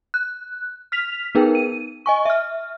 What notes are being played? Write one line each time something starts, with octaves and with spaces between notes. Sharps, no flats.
F#6
F6 B6 F7
B3 D#4 G#4 A#4 B4 G5
D#7
D#5 G#5 C#6
E5 F6